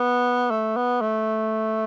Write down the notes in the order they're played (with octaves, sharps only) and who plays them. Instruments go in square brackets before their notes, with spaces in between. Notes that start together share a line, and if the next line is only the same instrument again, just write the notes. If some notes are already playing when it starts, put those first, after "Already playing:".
Already playing: [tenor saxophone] B3
A3
B3
A3